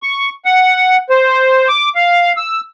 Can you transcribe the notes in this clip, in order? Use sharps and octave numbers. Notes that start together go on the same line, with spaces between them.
C#6
F#5
C5
D6
F5
E6